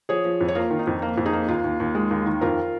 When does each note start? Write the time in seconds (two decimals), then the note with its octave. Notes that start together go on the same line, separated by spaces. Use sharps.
0.09 F3 G#4 C#5
0.25 F3
0.41 F2
0.48 C#5
0.55 A#3 F4 A#4
0.71 D#3
0.79 D#4
0.87 F2
1.02 A#3
1.18 F2
1.25 D#4 G#4
1.33 A#3
1.48 D#2 F4
1.64 D#2
1.80 D#2
1.95 G#3
2.11 D#2
2.26 D#3
2.41 F2 F4 A#4